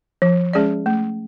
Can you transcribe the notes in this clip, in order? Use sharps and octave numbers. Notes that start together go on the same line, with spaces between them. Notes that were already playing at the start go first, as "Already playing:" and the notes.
F3
G#3 C#4 G#4 D5
A3